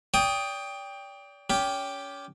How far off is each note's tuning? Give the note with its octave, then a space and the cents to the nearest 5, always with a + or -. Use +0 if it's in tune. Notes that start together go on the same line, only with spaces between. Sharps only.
D5 -40 G5 +15 D#6 +0
C#4 +25 G4 +0